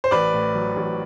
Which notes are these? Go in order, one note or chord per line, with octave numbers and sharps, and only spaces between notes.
C5
A1 B4 D5
A2
F#3
A1